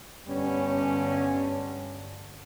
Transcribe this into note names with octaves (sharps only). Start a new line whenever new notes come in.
G2 D3 G3 B3 C#4